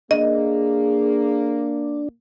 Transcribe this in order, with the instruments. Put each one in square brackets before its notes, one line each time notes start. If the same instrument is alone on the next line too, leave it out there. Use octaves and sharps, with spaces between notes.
[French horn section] A#3 [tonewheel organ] D4 [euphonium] G#4 [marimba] D#5